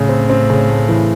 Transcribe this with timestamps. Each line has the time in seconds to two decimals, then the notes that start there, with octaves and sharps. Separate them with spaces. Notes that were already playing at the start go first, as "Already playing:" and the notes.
Already playing: A2 C#3
0.09 C4
0.29 C4
0.50 C#3
0.70 A3
0.89 E3